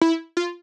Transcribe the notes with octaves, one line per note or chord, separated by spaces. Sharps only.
E4
F4